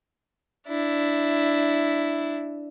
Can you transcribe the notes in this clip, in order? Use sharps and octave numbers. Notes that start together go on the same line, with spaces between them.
D4 E4